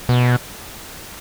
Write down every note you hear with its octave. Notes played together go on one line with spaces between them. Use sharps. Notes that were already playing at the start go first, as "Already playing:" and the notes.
B2